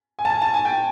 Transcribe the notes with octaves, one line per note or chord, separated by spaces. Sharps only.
G#5
A5
G#5
A5
G#5
G5